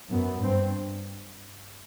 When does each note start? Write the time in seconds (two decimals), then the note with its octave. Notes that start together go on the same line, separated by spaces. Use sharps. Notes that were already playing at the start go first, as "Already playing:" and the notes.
0.12 F#2 B3
0.43 G2 C4